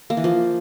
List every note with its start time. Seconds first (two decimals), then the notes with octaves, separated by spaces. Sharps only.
0.10 A#3
0.17 E3
0.24 F3